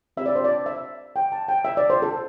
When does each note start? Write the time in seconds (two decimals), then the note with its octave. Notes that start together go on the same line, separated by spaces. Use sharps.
0.17 C4 G4 E5
0.26 D5
0.35 C5
0.44 D5
0.66 E5
1.16 G5
1.32 A5
1.48 G5
1.65 E5
1.77 D5
1.90 C5
2.02 A4